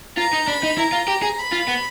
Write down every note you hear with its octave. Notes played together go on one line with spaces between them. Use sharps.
F4 A#5
D#4
D4 B5
D#4
E4 A#5
F4
G4
G#4
B5
F4
B3